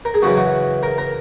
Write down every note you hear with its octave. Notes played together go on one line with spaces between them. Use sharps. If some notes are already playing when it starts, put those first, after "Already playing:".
A#4
G#4
F#2 C#3 E3 F#4
F#4
A#4
A#4